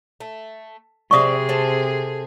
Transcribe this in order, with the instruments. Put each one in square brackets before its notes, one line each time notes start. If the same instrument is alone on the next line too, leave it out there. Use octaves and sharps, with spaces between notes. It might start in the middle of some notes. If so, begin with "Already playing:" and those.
[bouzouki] A3
[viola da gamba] C3 G#4 [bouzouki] C4 D5 E5 [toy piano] C#6 D#6
[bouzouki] C4 A4